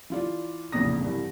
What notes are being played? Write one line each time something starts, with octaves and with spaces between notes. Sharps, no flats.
E3 F4 D5
F1 A#1 E2 C#3 D#6 A#6
C2 G2 E3